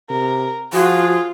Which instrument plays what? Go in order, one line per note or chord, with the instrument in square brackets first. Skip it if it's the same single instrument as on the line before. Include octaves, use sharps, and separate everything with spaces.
[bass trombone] C3 [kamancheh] A#4
[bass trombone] F3 [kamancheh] F4 [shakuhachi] F#4 [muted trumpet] G#4